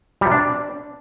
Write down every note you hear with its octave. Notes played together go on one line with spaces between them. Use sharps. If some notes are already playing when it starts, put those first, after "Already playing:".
G3
C3
D4